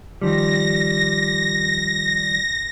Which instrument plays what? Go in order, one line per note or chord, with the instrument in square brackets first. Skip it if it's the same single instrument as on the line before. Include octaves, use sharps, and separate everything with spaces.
[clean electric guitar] D#3 F3 G3 [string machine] A#6